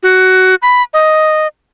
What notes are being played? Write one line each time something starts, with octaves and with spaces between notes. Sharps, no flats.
F#4
B5
D#5